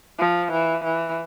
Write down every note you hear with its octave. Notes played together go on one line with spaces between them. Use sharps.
F3
E3
E3